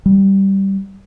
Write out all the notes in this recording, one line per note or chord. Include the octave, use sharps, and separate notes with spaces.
G3